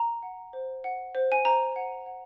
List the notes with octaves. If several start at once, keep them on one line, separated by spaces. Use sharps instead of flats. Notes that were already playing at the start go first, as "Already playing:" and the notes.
Already playing: A#5
F#5
C5
F#5
C5
G#5
C5 A#5
F#5
F#5